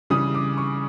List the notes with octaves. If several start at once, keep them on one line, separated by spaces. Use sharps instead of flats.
C#3 E3 G3 D#6
D6
C#6